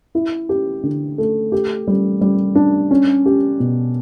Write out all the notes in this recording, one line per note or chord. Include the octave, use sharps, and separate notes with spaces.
E4
G4
D3
A3
G4
G3
G3
D4
C#4
G4
B2